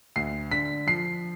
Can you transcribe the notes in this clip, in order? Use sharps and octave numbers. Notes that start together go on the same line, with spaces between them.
D2 C7
D3 B6
F3 C7